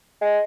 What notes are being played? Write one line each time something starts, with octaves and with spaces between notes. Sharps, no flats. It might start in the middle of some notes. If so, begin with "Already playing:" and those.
G#3